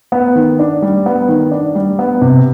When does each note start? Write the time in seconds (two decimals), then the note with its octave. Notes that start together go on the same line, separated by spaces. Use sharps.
0.12 B3
0.35 D#3
0.59 D4
0.82 G3
1.06 B3
1.29 D#3
1.51 D4
1.75 G3
1.99 B3
2.21 C3